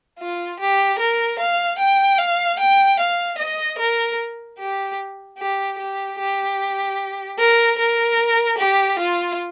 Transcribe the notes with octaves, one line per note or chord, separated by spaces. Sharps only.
F4
G4
A#4
F5
G5
F5
G5
F5
D#5
A#4
G4
G4
G4
G4
A#4
A#4
G4
F4